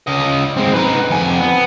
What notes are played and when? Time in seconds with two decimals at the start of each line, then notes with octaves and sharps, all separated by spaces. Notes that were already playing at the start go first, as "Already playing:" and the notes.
0.07 C#3 D#5
0.57 G#3 C4
0.74 D#4 B4
1.11 F2 G#5
1.40 B3